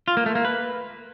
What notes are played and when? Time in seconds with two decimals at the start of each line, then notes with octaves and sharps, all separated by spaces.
0.08 F4
0.17 A#3
0.26 A3
0.35 A#3
0.45 B4